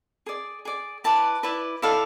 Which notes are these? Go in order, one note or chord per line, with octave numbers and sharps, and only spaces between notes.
G#4 D5
G#4 D5
E4 B4 D5 A5
E4 B4 D5
E4 A4 D5 F5